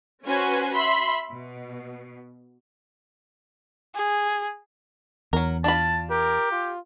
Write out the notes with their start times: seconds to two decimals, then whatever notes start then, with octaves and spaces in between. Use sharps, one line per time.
0.25 C#4 F#4 B4 C5 G#5
0.73 E5 B5 C6
1.32 B2
3.95 G#4
5.33 E2 F#3 A#4
5.64 D4 F4 A5 B5
6.11 G4 A#4
6.52 F4